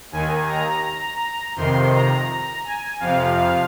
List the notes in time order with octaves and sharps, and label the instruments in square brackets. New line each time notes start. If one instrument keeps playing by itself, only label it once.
[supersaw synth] D#2 D#3 G#5
A#5
F2 C3 D#3 C6
A#5
G#5
F2 C3 F3 F5
F5